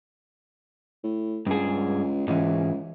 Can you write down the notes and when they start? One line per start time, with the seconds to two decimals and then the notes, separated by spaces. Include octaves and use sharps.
1.04 A2
1.47 C#2 G2 G#4
2.28 C#2 G#2 E3